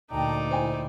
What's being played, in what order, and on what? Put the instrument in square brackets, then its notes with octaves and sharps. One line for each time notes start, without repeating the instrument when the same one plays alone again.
[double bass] D2 A#2 [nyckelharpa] D#4 D5 [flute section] G5 A5 A#5
[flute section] E4 [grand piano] C5 G5 G#5